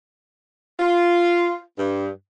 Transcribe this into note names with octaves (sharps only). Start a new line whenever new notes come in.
F4
G2